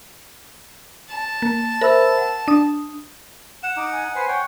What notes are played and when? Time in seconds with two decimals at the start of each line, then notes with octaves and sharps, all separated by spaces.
1.09 A5
1.42 A#3
1.81 A#4 C5 E5 B5 E6
2.18 F#5
2.48 D4 D#6
3.63 F#5 E7
3.77 D#4 D6
3.92 G#5
4.15 B4 C5 G#5
4.28 C#5 F#5 G5